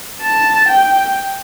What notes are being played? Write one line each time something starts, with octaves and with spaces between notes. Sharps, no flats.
A5
G5